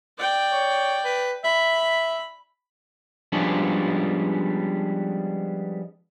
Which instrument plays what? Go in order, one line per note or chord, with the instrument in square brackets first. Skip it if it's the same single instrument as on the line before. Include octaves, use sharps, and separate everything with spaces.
[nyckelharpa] D5 G5
[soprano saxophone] C#5
B4
[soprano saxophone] E5 [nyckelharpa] B5
[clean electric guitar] F3 G3 G#3 B3 C#4 D4